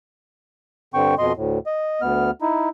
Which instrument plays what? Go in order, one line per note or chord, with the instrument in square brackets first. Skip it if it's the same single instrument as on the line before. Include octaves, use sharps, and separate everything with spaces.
[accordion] G2 D3 C4 G5 C#6
F2 B2 D#5 C6
D2 A2
D#5
D2 B3 F6
D#4 E4